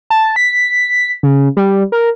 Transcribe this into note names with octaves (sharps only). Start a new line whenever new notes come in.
A5
B6
C#3
G3
A#4